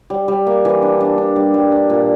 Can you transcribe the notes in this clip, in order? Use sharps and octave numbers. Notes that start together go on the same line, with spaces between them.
G3
G3
A#3
E3
D4
D4
D4
G3
G3
D4
A#2